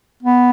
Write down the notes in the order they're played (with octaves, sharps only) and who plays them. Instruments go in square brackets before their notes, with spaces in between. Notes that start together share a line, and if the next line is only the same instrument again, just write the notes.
[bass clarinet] B3